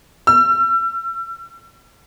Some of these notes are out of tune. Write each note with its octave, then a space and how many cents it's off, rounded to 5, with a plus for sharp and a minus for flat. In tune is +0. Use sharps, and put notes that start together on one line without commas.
E6 +40